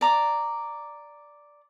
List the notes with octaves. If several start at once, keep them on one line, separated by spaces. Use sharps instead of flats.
D5 A#5 D6